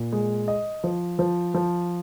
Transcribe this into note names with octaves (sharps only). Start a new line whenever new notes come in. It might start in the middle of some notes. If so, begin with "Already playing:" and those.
Already playing: A#2
G#3
D#5
F3
F3
F3